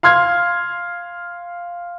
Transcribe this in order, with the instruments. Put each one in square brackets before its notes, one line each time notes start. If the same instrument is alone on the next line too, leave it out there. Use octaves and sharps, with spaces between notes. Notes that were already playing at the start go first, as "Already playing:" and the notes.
[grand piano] F5 C6 F6 G#6